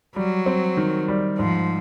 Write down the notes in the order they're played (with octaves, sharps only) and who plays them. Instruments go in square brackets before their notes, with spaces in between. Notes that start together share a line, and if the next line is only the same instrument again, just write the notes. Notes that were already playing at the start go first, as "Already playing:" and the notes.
[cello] F#3 [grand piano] G3
[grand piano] C4
D#3
G3
[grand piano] G#2 [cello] F3